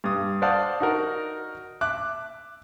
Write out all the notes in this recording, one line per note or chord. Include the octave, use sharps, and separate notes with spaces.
G2 D#6
C5 D5 F5 F#5 A5 D#6
D#4 F#4 A#4
E5 D6 F#6